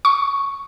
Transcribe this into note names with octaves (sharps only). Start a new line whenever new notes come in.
C#6